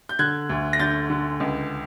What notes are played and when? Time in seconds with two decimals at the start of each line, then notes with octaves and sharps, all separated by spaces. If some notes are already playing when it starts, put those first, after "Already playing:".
0.09 G6
0.19 D3 F#6 G#6
0.49 D2
0.73 A#6
0.79 D3 G6 A6
1.10 D3
1.40 C#2